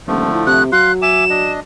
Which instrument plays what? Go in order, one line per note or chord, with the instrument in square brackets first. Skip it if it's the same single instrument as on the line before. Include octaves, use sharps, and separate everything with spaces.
[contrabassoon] D#1 [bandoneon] D3 F3 A3
[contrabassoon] A2
[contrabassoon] C3 [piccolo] F#6
[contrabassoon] F#3 [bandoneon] F5 C6 [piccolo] F#6
[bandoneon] E5 G#5 D6 [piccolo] E7
[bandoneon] D4 D#5